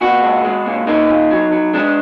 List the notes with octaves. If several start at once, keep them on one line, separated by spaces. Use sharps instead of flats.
A#2 F#4
G#3
G#3
A#2
A#3 D#4
A#2
F#3
F#3
G#3 D4